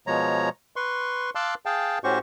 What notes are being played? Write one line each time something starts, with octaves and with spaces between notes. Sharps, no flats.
B2 F3 G#3 C#5 A#5
B4 C6 C#6
F5 A5 C6 D6 E6 F#6
G#4 F5 G5 A5
A2 C#4 F#4 G4 C5 C#6